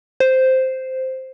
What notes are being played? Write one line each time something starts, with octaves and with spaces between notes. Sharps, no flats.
C5